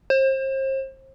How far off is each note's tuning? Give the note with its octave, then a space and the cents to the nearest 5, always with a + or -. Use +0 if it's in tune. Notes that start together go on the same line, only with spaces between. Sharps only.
C5 +35